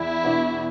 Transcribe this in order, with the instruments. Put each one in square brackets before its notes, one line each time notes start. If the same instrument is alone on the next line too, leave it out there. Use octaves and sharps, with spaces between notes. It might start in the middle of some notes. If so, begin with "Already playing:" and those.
Already playing: [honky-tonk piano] E2 [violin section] E4
[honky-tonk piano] B2 B3 D4